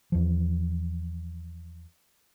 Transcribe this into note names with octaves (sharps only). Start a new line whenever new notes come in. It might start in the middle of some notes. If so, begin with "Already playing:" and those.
E2 F3